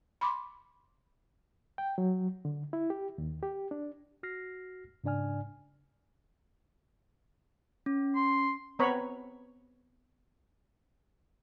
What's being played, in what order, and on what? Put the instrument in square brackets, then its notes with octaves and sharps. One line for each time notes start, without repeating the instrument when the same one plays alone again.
[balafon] B5 C6 D6
[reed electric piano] G5
F#3
D3
E4
G4
D#2
G4
D4
[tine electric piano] F#4 F6 A#6 C7
G#2 C#3 D4 D5 G#5 F6
[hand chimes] C#4
[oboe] C6
[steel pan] B3 C4 B4 C#5 A#5 B5